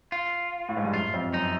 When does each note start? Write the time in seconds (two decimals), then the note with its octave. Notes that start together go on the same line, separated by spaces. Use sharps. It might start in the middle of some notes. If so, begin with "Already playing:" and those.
0.12 F4
0.69 A2
0.77 G#2
0.85 G2
0.93 F#2 F4
1.14 F2
1.34 F#2 D#4